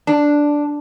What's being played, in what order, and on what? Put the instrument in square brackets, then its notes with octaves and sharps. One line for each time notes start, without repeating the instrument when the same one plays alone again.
[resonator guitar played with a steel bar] D4